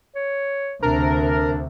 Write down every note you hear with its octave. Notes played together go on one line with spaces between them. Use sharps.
C#5
D2 C3 D4 A#4